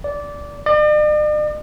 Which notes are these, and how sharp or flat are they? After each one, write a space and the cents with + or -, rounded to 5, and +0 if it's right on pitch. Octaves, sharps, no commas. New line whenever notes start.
D5 -15
D5 +45